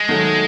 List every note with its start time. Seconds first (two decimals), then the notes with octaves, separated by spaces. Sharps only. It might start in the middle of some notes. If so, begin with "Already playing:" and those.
Already playing: G#3
0.09 D#3 F#3 A3